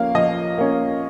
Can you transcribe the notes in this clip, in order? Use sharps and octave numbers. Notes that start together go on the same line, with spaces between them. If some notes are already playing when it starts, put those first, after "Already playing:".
Already playing: F3 A#3 C#4 F5
F3 D#5
A#3 C#4